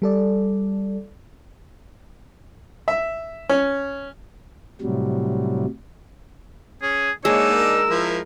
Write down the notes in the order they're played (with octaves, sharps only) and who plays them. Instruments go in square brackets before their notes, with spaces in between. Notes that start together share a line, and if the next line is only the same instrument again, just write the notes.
[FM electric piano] G3 A4 D5
[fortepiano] E5
C#4
[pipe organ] A2 C3 F#3 G3
[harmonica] C#4 [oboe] G#4
[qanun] G#3 [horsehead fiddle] A#3 C#5 [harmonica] D4 D#4 [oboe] E6
[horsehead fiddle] A#4
[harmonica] F3 E4